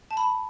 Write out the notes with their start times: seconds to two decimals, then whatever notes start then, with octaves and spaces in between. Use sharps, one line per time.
0.11 A5
0.17 B5